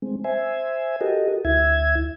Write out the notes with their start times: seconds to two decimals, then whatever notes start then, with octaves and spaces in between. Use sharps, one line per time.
0.02 G#3 C4
0.24 C5 E5 G#5
1.01 F#4 G4 A4 A#4 D#5
1.45 D2 E4 E5 G#6